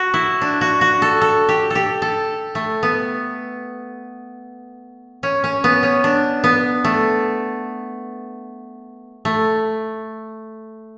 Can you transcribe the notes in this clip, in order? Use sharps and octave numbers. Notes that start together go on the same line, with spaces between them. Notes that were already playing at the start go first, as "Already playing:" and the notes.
Already playing: F#4
E4
D4
F#4
F#4
A4
A4
G4
G4 A4
A4
A3
B3
C#4
C#4
B3
C#4
D4
B3
A3
A3